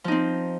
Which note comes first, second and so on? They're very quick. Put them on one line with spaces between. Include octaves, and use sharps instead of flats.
F3 D#4 C4